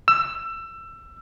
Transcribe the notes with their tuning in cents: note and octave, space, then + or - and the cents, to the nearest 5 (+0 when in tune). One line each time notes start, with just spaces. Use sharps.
E6 +25